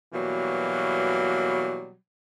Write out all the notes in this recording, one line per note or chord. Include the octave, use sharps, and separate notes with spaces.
B2 E3 F#3 G3 A#3